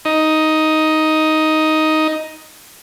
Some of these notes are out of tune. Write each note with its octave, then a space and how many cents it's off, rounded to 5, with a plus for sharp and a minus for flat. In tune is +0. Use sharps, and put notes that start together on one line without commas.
D#4 +5